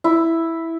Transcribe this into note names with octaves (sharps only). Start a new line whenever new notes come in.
E4